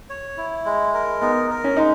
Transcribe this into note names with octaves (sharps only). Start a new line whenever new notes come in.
C#5
E4
G#3
A#4
B3 D#4
A#4
C#4
G#3 D#4